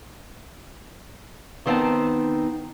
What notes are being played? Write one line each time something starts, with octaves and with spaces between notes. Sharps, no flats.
D#3 B3 C4 D#4 F5 A5